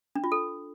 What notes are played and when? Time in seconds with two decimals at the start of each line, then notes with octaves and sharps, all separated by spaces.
0.16 D4
0.24 F4
0.32 A4